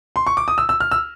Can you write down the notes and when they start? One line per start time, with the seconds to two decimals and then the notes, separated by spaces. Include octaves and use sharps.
0.16 C6
0.27 C#6
0.37 D6
0.48 D#6
0.58 E6
0.69 E6
0.80 F6
0.91 E6